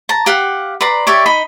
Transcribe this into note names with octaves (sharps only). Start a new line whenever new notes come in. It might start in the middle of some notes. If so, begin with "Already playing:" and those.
A5 A#5
G4 F5 F#5
B4 D5 A#5 C6
G4 C#5 D5 E5
D#4 D#5 B5